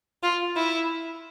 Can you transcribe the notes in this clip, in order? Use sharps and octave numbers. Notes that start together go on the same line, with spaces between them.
F4
E4